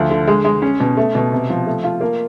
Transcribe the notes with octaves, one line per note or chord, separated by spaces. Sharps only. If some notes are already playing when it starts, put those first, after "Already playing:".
Already playing: D2 F3
D3
G#3
G#3
C#4
B2
A3
B2
C3
F3
A3
F4
A#3